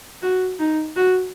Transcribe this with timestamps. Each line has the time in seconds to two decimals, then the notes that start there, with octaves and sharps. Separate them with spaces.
0.22 F#4
0.60 D#4
0.96 F#4